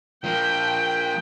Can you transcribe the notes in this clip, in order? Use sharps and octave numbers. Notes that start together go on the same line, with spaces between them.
F3 A#3 G5